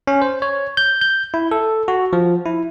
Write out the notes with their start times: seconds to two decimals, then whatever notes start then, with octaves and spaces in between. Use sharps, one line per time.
0.07 C#4
0.22 C5
0.42 C#5
0.77 G6
1.01 G6
1.34 E4
1.51 A4
1.88 F#4
2.13 F3
2.46 E4